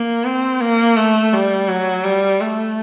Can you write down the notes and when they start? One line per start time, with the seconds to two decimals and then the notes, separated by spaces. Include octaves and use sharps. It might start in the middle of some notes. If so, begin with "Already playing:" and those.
Already playing: A#3
0.25 C4
0.61 A#3
0.96 A3
1.33 G3
1.68 F#3
2.04 G3
2.41 A3